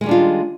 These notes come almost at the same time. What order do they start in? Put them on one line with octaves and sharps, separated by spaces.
G#3 D#3 G3 D4 F4